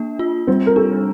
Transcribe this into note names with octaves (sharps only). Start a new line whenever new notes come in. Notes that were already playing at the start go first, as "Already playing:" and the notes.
Already playing: A#3 D4
F4
G3 C4
A#4
D4 A4